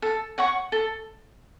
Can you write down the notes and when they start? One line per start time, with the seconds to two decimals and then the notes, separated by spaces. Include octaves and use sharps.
0.02 A4
0.38 C#5 F#5 C#6
0.72 A4